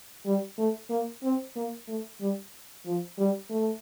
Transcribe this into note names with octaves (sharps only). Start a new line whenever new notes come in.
G3
A3
A#3
C4
A#3
A3
G3
F3
G3
A3